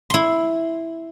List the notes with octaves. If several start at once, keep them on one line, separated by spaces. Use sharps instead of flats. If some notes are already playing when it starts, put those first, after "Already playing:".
E4 C6